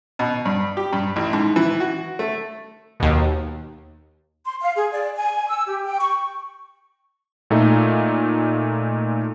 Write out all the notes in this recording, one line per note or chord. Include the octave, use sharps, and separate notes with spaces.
B2
G2
G4
G2
A1
G#2
E3
F#4
A3
D#2 B2
C6
F5
G#4
D5
G#5
E6
G4
G5
C#6
A#2 A3 D#4 F4